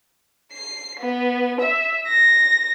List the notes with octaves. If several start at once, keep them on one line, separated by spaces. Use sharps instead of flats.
C7
B3
E5
A#6